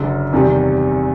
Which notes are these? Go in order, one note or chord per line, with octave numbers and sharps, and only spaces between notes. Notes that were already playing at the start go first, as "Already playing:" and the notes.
Already playing: F#1 F#2 D3
E2 C3 D#3 G3